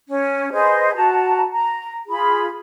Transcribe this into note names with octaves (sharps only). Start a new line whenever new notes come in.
C#4
G#4 B4 C5 D#5
F#4 A5 A#5
A#5
F4 G#4 B5